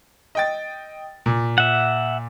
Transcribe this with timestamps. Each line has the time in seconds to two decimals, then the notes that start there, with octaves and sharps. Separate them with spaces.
0.35 D#5 G5 A6
1.26 A#2
1.58 E5 F#5